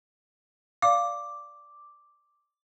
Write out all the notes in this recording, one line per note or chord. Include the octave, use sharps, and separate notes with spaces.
D5 F5 D6